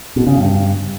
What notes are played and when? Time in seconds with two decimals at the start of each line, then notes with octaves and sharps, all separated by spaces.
0.16 B2
0.27 C#3
0.37 G2